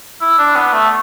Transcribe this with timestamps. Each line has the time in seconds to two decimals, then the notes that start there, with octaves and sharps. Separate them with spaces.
0.21 E4
0.38 D4
0.56 B3
0.72 A3